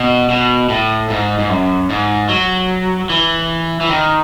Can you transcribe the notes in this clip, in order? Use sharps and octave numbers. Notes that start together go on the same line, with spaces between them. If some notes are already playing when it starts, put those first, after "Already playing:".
Already playing: B2
B2
A2
G#2
G#2
F#2
G#2
F#3
E3
E3
D#3